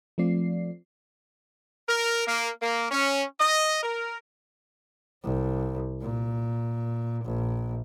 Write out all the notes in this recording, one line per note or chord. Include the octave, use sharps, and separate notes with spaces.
F3 A3 C4 F4 D5 C7
A#4
A#3
A#3
C#4
D#5
A#4
C2
A#2
A#1